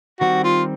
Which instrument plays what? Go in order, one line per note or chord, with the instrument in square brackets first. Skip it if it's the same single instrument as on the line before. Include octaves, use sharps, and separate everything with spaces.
[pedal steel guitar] D#3 G3 C4 [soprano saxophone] F#4
[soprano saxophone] F4